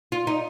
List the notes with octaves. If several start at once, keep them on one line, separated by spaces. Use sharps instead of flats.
F4
D#4